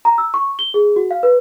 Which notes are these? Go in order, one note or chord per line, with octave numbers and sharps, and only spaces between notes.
A#5
E6
C#6
G7
G#4
F#4
F5
B4